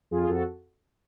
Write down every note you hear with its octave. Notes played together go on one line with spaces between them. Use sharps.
F2 F4 G#4
G#4
F2 F#4 A4